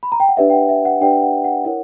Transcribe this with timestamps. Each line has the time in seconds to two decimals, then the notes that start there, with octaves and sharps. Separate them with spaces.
0.03 B5
0.12 A#5
0.20 G5
0.29 F#5
0.37 D4 G4 B4 D5 E5
0.50 G5
0.53 F#5
0.69 E5
0.85 F#5
1.01 D4 G4 B4 D5 G5
1.22 F#5
1.44 F#5
1.65 E4 A#4 C#5 F#5